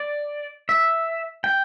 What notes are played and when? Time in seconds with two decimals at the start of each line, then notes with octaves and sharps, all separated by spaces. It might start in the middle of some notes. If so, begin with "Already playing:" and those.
Already playing: D5
0.69 E5
1.44 G5